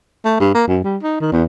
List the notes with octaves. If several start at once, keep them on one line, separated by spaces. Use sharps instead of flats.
A3
G2
A#3
F#2
G3
D#4
D#3
E2